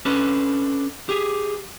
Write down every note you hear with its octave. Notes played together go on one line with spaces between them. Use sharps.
C#4 D4 A4 B4
G4 G#4